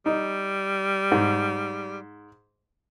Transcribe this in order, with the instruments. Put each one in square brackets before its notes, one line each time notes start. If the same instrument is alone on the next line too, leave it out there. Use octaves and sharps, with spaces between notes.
[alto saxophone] G3 [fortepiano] D#4
[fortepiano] G#2